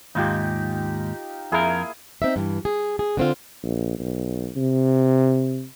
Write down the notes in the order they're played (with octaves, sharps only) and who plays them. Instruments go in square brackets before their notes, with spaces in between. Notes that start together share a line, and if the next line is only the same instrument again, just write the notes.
[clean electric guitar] D#2 G#2 [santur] D#4 F4 G4
[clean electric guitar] F2 A#4 [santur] A#3 E4 G#4
[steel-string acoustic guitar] C4 D#4 E5
G2 E3
G#4
G#4
D3 C4 F4
[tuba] A#1
B1
C3